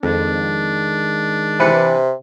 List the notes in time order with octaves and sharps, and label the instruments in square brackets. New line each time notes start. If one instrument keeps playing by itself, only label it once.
[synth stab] F2 [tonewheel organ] D#3 G#3 [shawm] D4
[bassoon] C3 [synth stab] E3 B4 C#7